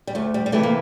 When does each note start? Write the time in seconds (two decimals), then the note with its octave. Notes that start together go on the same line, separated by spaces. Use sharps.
0.07 G3
0.15 D2 A3
0.34 G3
0.46 G3
0.52 C3 E3 A3
0.63 A#3